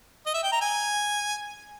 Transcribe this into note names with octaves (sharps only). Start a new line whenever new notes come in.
D#5
E5
G5
A#5
G#5